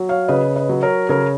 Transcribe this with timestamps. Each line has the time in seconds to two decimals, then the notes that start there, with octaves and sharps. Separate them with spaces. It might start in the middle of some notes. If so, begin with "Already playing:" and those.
Already playing: F#3
0.09 C#5 F5
0.28 C#3 B4 D#5
0.56 B4 D#5
0.69 F#3
0.83 A#4 C#5
1.09 C#3 A#4 C#5